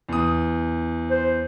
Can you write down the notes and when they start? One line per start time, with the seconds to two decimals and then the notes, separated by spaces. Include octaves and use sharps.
0.09 E2 D#6
1.11 C5